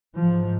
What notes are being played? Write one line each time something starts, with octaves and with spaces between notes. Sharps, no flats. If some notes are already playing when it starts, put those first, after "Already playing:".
G#2 F3